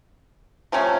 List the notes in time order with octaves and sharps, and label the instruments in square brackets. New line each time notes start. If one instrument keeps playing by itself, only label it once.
[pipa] C3 F3 A3 C#4